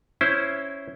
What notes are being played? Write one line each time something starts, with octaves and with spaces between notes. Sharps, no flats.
C#4 E4 C5